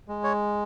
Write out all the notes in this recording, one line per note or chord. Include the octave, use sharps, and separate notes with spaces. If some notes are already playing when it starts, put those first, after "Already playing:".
G#3
C#5